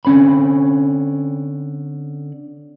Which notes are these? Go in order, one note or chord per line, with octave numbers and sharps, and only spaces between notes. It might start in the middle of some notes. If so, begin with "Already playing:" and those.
D3 C4 C#4 C5 B5